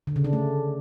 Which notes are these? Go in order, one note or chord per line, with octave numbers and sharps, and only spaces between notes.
D3
C#3
D4
A3